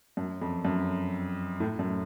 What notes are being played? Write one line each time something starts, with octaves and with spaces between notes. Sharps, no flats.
F#2
F2
F#2
A2
F#2